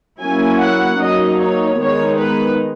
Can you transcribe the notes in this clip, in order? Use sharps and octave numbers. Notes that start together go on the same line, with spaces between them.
F#3 A#3 C#4 E4 G#5
F#5
F#3 A#3 D#4 D#5
C#5
D#3 G#3 B3 D#4 C#5
B4